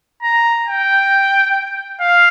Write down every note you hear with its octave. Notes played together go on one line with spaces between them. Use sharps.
A#5
G5
F5